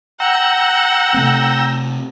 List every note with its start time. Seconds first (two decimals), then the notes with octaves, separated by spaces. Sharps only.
0.20 F#5 G5 A#5 E6
1.14 C3 A3 C4